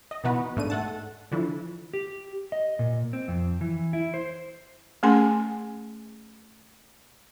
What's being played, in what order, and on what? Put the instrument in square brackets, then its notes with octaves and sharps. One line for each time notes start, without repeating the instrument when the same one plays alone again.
[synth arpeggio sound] D#5
B2 E3 B3 D#4 F#4 B4
G#2 A3 D4 D#7
A3 F#5 A5
D3 E3 F3
[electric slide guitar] G4
D#5
A#2
C4
F2
E3
E4
C5
[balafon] A3 C#4 G#4 G#5 C6